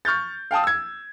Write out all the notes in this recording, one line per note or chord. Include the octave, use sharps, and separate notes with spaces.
C#6 F6 G6 A6
F5 G5 A5 D#6
E6 G#6